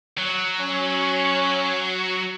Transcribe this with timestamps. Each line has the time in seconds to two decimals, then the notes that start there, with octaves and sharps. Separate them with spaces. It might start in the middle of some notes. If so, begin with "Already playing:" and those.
0.18 F#3
0.60 C#4